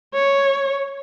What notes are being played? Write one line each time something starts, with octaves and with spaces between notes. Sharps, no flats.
C#5